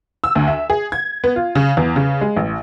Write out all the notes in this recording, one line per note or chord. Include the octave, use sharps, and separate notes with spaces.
E6
D2
E5
G#4
G#6
B3
F4
C#3
E2
C#3
G#3
A1